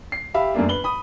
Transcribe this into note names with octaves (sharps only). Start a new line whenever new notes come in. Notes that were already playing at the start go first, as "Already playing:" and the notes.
C7
G4 E5 F5 B5
F#2 A3 A#3 D4
B4 F#7 G7
B5 D#6